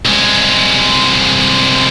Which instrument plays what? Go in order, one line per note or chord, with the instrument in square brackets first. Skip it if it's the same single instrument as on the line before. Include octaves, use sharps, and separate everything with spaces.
[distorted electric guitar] C2 G#3